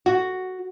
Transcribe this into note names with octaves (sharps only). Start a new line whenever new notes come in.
F#4